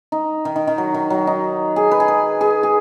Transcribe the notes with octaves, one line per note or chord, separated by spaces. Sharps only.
D#4
D#3
D#3
D#3
F#3
D#3
F#3
D#4
G#4
B4
G#4
B4
G#4
G#4